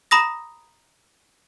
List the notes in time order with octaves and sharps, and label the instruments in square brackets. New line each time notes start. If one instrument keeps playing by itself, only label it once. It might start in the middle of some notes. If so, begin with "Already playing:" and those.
[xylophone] A#5 B5 D#6 A#6